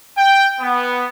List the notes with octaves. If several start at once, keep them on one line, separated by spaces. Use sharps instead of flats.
G5
B3